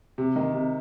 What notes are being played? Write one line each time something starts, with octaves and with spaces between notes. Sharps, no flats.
C3
D#3
C3